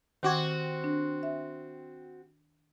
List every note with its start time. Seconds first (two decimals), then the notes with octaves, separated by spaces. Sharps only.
0.23 D#3 C4 F#4 D6 G#6
0.84 D4
1.23 E5